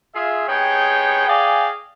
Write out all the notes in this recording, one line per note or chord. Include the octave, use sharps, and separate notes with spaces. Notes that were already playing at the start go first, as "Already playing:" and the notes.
F4 G#4 E5
C3 B3 D#4 G#4 C#5 G5
G#4 D5 D#5 F5 G5 G#5